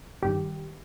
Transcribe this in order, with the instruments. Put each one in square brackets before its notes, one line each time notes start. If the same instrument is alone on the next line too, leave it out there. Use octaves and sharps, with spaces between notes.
[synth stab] G1 G2 D#3 G4